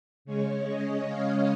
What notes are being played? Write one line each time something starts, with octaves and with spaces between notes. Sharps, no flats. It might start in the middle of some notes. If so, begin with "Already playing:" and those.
C#3 G#3 C#4 C#5
D#5
F5